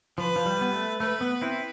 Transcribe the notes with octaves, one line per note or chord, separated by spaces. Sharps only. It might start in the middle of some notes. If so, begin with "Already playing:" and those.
F3 B4
F3
G3
B3
A3
A3 B4
B3
C4 E4